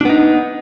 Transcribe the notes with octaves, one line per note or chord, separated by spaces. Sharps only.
B3 D4 D#4